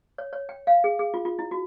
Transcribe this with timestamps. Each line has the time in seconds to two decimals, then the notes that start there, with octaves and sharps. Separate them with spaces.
0.18 C#5
0.33 C#5
0.49 G5
0.67 F5
0.84 G#4
0.99 G#4
1.14 F4
1.25 F4
1.39 E4
1.51 F#4